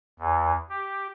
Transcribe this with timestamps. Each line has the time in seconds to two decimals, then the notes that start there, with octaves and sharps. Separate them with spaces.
0.19 E2
0.69 G4